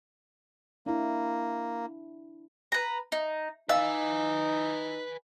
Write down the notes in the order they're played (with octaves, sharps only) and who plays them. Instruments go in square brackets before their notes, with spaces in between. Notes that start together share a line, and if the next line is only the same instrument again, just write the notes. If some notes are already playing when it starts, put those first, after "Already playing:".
[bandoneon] A#3 [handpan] D4 E4
[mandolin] B4 A#5
D#4
[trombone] D#4 [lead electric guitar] B4 G#5 [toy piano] D#5 F5 [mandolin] E6